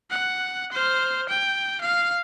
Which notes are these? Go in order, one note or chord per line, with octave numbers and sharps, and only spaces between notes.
F#5
C5 F6
G5
F5